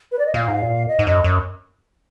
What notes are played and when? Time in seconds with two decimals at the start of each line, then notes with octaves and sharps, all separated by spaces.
0.12 B4
0.19 D5
0.26 D#5
0.34 A#2 F5
0.48 G#2
0.62 A#2
0.88 D#5
0.99 G#2
1.06 F#2 D#5
1.24 F#2